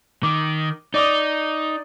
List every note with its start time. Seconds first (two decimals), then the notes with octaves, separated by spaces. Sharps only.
0.23 D#3 D6
0.94 D#4 D5 D6 D#6